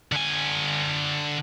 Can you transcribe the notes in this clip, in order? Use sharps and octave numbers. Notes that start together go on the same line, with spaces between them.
D3 G#5